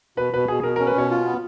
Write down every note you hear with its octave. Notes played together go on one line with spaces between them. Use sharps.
B2 B4
B2 B4
B2 G#4
G#4
B2 A#4
C#4 A#4
B4
B2 C#5
F4
B3